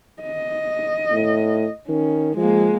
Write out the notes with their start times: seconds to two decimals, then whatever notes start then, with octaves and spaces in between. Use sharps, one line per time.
0.23 D#5
1.12 A2
1.88 D#3 C#4
2.37 F3 G#3 A#3